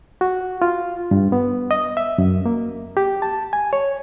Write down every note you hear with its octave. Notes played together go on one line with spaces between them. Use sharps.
F#4
F4
G2
B3
D#5
E5
F#2
A#3
G4
A5
G#5
C#5